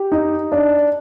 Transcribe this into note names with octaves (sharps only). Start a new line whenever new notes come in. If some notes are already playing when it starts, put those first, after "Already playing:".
Already playing: G4
D#4
D4